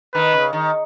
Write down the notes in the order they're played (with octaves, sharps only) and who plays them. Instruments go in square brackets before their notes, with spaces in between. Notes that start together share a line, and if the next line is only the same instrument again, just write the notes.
[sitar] D#3 [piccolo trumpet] B4
[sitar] C#3
D#3